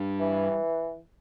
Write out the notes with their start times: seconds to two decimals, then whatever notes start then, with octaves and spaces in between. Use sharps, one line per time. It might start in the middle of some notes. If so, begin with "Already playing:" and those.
Already playing: G2
0.20 E3